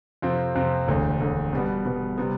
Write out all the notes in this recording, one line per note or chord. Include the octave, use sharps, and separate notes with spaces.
F2 C3 F3 C4
F2 C3 F3 C4
E1 D2 D3
E1 D2 D3
B2 G3 B3
B2 G3 B3
C3 G3 B3